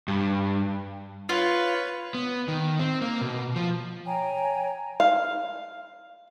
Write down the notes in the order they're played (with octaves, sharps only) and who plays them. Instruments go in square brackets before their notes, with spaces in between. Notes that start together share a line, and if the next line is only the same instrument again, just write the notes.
[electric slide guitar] G2
[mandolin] F4 [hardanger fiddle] B4 C#5
[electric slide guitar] B3
D#3
C4
A#3
B2
F3
[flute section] C#5 G5 G#5 A#5
[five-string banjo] F5